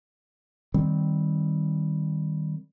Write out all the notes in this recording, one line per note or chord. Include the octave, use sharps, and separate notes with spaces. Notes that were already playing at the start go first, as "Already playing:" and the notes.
D#3 G3 C4